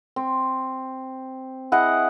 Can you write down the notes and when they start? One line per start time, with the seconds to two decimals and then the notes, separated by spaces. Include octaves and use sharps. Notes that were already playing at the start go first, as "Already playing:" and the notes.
0.16 C4
1.72 E4 G#4 D#5 F#5